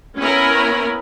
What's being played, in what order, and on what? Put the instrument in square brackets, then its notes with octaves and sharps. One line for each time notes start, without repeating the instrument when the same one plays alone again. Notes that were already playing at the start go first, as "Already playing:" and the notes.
[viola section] B3 C#4 E4 A#4 B5